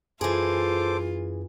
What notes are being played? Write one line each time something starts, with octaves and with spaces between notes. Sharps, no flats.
F#2 E3 F4 G#4 A4 C5 D6